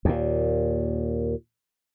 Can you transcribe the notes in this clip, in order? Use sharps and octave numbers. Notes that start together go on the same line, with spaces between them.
D#2 A#2